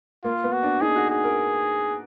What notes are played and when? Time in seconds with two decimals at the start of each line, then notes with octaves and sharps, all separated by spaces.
0.24 A#3 F4
0.44 B3
0.52 F#4
0.63 D4
0.81 D#4 G#4
0.96 F#4
1.10 G#4
1.24 A#4